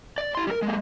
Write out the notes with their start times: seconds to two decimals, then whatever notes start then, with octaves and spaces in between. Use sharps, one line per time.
0.18 D5
0.35 E4 C6
0.47 G3 A#4
0.62 G#3 A#3